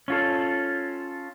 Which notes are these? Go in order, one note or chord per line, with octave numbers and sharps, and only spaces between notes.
C#4 F4 A4